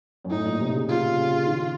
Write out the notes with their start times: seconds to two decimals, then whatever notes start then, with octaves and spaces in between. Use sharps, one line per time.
0.24 F#2
0.30 A2 D#4
0.45 A#2
0.60 C3
0.75 C#3
0.89 F4
1.18 C#3
1.47 D#3